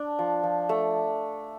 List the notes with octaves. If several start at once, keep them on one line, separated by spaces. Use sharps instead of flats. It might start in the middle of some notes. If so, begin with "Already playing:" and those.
Already playing: D4
F3
F3
A3